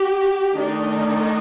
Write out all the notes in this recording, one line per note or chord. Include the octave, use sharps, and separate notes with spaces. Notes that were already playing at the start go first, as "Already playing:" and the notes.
Already playing: G4
D#3 A3 D4 D#4